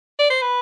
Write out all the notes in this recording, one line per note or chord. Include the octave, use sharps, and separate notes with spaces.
D5
C5
B4